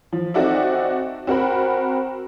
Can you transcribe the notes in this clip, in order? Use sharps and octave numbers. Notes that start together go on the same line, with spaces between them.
F3
C4 D#4 F#4 A4 D5 E5
C4 F#4 A#4 B5